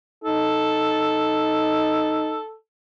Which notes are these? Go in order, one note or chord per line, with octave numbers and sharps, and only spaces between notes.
D#4 A4